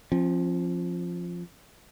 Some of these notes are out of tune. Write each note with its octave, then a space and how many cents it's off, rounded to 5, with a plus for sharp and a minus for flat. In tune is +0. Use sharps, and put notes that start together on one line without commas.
F3 +0 C4 +45